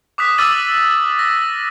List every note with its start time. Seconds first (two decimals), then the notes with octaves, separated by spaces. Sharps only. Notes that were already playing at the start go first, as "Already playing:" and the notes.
0.18 D6 D#6 F#6 B6
0.38 D6 E6 F6 A6 D#7 F#7
1.19 A#6